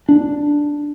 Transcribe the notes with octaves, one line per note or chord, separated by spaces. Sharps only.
D4